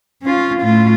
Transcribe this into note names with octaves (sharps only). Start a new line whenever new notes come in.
C#4 F4
A2 F4